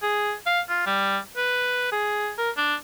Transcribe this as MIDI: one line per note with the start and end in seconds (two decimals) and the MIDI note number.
0.03 0.33 68
0.46 0.61 77
0.69 0.82 65
0.86 1.18 55
1.37 1.88 71
1.92 2.32 68
2.38 2.50 70
2.57 2.75 62